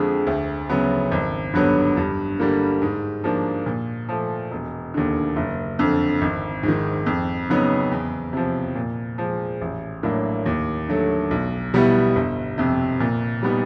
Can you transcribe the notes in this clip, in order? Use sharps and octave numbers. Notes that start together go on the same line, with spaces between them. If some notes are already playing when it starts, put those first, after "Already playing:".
Already playing: F2 D3 F3 G#3
D2
C#3 F#3 B3
G#1
G2 D3 F#3 B3
G2
D3 G3 A#3
G#2
F3 A#3 D4
A#2
F3 A3
E1
D#2 D3
F#1
F2 D3
G#1
G#2
D#3
F2
C#3 F#3 B3 D#4
E2
C3 F3
A#2
F3 G#3
A1
A2 F#3 A#3 D4
D#2
D3 F#3 A3
B1
B2 G3 B3 E4
G1
F2 C3
A#2
G3 B3 D#4